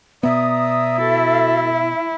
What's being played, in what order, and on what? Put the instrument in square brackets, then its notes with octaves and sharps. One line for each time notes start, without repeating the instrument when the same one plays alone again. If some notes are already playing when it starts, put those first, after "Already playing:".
[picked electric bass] B2 B3 [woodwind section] D5 A#5 D#6 [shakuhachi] E5
[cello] E4 [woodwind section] F#4 A4